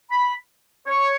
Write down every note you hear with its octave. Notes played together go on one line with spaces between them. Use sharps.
B5
C#5